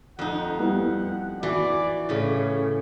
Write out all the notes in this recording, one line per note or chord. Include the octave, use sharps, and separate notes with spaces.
F2 D#4 F#5
G3 B3 E4 F#5
E3 F#4 D5
A2 C#3 C#5